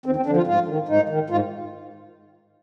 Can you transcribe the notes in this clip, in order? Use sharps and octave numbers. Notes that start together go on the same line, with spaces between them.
D#2 C4
C4
D3 F3 D4
F4
G#2 F4
D#3
G#2 D#4
D#3
G#2 F4